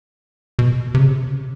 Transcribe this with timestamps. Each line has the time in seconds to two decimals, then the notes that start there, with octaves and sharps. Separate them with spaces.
0.59 B2
0.94 C3
1.00 C#3